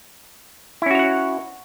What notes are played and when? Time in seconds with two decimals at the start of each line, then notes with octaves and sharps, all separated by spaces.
0.82 E4
0.86 C#4
0.91 F#4
0.95 C#5
0.99 F#5